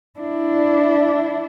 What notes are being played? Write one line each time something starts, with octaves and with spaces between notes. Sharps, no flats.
D4 E4